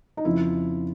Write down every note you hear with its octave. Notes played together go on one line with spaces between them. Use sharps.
D#4
F2 C#3 F3 E4